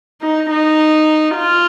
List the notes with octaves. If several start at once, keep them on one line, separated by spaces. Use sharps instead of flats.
D#4
D#4
F4